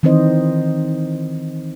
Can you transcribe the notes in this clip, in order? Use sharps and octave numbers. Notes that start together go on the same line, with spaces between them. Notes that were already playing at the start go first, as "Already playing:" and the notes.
D#3 E3 C4 D#4 C5 D#5